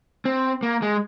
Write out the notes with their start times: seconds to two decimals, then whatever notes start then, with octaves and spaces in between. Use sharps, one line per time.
0.25 C4
0.63 A#3
0.82 G#3